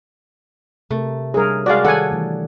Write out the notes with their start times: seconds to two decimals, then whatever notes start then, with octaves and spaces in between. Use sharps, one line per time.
0.91 C3 A3 A#4
1.34 G3 D4 G#4 A#4 C#5
1.66 G#3 F#4 D5 F5
1.84 D#3 D4 G4 A4 D5 F#5 G#5
2.11 E3 A3